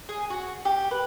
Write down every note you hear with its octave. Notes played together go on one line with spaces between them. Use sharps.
G#4
F#4
G4
B4